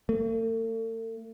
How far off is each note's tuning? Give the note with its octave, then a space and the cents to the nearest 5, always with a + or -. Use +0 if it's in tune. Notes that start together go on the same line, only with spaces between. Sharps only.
A3 +40